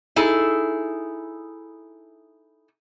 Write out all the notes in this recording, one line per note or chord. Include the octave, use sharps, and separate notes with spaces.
D#4 E4 G#4 A4